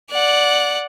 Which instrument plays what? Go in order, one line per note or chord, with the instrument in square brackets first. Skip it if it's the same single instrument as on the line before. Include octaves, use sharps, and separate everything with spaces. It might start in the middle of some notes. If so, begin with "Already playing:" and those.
[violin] D5 F#5